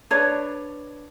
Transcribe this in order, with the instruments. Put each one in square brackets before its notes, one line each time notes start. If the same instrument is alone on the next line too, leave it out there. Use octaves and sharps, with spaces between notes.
[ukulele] D4 B4 C#5 D5